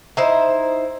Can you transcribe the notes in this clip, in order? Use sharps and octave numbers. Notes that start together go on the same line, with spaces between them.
D#4 E4 C5